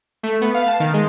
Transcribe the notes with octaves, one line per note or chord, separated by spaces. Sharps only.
A3
B3
F5
A5
D#3
G#3